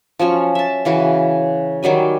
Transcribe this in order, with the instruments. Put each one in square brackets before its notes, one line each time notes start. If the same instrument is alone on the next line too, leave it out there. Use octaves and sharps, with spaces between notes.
[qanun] F3 F#3 C#4 C#6
E5 A5
C#3 E3 F#4
D#3 F#3 G3 G#5